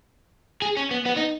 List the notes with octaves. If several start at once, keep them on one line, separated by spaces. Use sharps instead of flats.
G#4
C#4
B3
B3
D#4